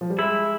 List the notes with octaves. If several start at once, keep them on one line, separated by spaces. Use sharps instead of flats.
F3
G3
G#3 E4